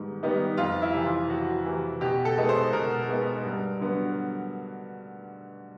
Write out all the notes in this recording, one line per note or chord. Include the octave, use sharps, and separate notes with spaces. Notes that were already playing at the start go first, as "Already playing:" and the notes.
Already playing: G#2 D#3 G3 B3 D#4
D#3 G3 B3 D#4
F2 F4
E4
C3 E3
F4
F2 F#4
C3 E3
B2 G4
A4
G#3 B3 D#4
C5
B2 A#4
G#3 B3 D#4
G2
D3 F#3 B3